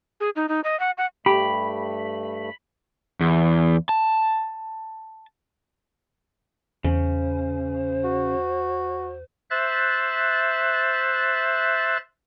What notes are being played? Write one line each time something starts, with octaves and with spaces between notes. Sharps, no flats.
G#4
D#4
D#4
D#5
F#5
F#5
G2 A3 G4 B5
E2
A5
E2 C#3 C5
F#4
C5 E5 F#6 A6